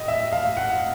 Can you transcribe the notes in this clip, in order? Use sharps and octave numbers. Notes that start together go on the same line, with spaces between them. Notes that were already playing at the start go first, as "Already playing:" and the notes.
Already playing: A2 D#5
E5
F5
F#5